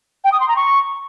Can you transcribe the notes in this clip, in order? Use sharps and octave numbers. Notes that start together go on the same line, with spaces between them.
G5
D#6
C6
A#5
C#6